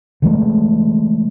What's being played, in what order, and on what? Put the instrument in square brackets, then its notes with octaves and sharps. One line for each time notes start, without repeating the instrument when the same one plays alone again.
[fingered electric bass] C#3 E3 G#3 A3